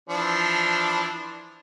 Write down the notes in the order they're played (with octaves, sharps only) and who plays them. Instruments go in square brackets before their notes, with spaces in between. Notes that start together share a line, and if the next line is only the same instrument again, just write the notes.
[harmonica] E3 F3 D4